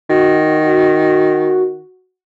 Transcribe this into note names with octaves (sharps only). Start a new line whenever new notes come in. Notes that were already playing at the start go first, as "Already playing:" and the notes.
D#3 F#4